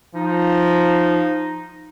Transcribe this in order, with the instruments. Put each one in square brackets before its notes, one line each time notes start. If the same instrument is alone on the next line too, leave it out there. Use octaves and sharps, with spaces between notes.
[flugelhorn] F3 [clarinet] D#4